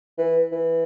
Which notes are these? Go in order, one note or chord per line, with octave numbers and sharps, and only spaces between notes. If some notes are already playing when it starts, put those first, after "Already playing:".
E3
E3